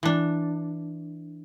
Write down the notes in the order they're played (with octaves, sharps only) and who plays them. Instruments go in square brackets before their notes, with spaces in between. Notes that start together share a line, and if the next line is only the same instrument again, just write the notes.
[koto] E3 D4